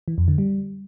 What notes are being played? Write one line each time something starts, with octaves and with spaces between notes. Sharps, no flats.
E3
F2
D3
G3